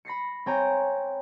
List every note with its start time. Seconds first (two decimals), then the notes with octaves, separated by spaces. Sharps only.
0.05 B5 A#6 C7 C#7
0.46 C4 C#5 G5 G#5 A#5